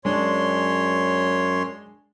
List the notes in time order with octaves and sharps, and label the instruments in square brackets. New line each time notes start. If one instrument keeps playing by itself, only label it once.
[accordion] F#2 C#5 C6 [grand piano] G#3 D4